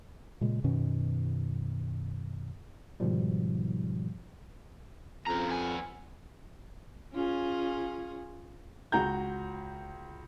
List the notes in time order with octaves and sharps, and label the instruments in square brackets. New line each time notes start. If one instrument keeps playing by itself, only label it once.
[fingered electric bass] A#2 C#3 G#3
F#2 B2 D#3 C#4
[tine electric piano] G#2 B2 D#3 F3 G3
[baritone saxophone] F2 [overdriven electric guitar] C#3 A#5
[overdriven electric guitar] B3 G#5
[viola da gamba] C#4 F4 G#4
[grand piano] C#2 F#4 A#5 G6